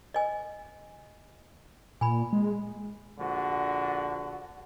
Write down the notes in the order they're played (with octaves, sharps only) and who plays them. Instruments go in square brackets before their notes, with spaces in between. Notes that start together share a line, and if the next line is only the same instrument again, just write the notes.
[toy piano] D#5 G#5
[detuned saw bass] A#2 [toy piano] G#5 B5
[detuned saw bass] G#3
[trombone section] A#1 D3 F#4